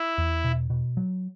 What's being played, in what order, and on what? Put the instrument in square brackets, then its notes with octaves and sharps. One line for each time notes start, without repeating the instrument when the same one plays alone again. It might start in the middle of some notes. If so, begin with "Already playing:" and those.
Already playing: [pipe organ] E4
[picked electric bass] E2
B2
B2
F#3